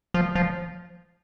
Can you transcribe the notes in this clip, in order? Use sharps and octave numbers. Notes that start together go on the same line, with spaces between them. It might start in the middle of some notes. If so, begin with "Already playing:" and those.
F3
F3